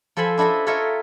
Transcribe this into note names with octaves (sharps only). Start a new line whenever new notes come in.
F3 A4 C5 G#5 B5
D4 E4 A4 D#5 E5
F4 A4 A#4 C#5 D#5 E5